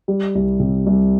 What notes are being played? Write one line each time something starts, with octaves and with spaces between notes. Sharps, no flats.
G3
C2
C3
C2